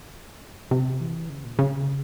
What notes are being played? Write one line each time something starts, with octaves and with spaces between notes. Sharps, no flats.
C3
E3
C#3
A#2
C#3